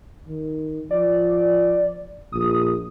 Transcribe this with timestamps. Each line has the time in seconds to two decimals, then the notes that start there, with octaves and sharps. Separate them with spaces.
0.28 D#3
0.91 F3 D5
2.33 A#1 D#6